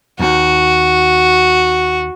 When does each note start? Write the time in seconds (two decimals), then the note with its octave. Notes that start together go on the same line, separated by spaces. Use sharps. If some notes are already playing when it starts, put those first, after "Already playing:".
0.19 D#2 F#4